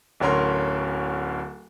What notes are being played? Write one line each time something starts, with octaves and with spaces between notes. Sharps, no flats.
D1 D2 C#4 A#4 C6